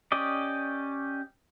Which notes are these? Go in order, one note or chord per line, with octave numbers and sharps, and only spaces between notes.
C#4 G4 D5 D#5